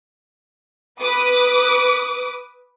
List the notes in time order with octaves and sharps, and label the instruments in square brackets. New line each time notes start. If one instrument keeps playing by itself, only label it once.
[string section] B4 D6 D#6